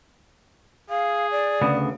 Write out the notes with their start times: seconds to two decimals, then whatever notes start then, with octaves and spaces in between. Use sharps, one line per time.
0.90 G#4 F5
1.31 D5
1.61 D2 C#3 B3